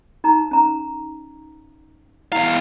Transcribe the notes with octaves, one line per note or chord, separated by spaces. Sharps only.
D#4 A#5
C#4 A#5
E2 E4 F5